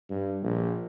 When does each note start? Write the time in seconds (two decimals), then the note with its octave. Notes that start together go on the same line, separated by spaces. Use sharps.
0.10 G2
0.43 A#1